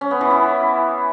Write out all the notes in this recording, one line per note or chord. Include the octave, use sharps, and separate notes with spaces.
C#4
B3
E3
E4